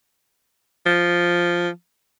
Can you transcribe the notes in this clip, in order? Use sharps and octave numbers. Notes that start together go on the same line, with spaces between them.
F3